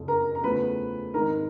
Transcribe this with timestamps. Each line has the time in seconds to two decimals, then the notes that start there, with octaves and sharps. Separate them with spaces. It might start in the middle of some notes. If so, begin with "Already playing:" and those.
Already playing: F#1 F2 C#3
0.08 A#4 A#5
0.35 A#5
0.44 E2 C#3 F3 A3 B4 B5
1.14 G#1 G#2 D#3 A#4 A#5